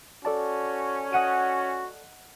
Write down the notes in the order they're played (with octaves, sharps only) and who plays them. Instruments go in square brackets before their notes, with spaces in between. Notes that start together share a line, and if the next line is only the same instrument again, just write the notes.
[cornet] C#4 [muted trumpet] F#4 [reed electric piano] A4 D5 A5
[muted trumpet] F#4 [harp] D#5 F#5 D#7